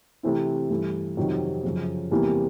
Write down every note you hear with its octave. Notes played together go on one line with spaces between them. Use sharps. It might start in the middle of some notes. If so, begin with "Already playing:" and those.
C3 E3 A3 C4 E4
G2 E3 A3
F2 C3 D#3 F#3
F#2 C#3 F3
E2 C3 E3 G3 A#3